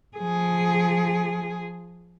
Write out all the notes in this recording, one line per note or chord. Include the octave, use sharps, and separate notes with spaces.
F3 G#4